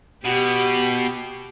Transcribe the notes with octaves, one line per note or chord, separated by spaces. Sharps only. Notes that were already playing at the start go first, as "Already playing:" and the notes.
B2 G4